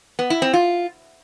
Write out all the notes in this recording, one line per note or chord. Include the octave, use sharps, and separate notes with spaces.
B3
E4
C4
F4